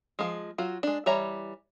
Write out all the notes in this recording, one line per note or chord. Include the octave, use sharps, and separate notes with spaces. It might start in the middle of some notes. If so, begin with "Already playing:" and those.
F3 G#3
F#3 F4 F#4
G#3 D4
E3 G3 C#5 E5 A#5